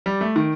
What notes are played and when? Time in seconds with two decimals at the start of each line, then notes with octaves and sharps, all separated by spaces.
0.06 G3
0.21 A3
0.36 D#3